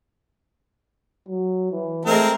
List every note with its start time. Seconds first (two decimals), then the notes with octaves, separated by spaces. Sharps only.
1.29 F#3
1.71 E3
2.05 G#3 A3 C4 A#4